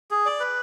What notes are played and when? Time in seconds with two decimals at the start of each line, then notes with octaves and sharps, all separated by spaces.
0.11 G#4
0.26 D5
0.40 B4